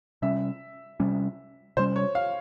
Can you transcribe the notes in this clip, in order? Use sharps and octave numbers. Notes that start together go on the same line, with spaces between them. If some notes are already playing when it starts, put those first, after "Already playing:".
C3 G3 C#4 E5
C3 G3 C#4
C3 G3 C#4 C5
C#5
F5